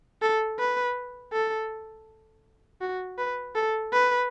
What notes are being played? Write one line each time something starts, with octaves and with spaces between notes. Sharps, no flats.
A4
B4
A4
F#4
B4
A4
B4